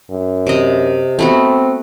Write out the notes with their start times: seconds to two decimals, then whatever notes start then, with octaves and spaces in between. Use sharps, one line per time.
0.10 F#2
0.47 C3 D#5
1.19 A3 B3 C4 F#4